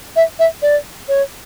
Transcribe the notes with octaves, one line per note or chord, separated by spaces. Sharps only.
E5
E5
D5
C#5